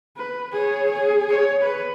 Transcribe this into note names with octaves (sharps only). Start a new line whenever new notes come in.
B4
G#4 C#5
G#4
C#5
B4